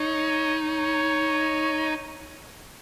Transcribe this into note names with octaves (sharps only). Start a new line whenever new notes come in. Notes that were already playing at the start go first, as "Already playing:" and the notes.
Already playing: D#4 C#5
C#5